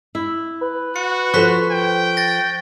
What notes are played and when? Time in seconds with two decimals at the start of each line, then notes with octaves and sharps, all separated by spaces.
0.15 E4
0.61 B4
0.96 F#4 C#7
1.34 F3 A4 C5 C#6 F#6 B6
1.71 G5
2.17 A6 A#6